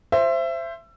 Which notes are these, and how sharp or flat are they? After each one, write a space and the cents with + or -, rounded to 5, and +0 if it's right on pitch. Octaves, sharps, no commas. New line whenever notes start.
C5 +5 E5 +25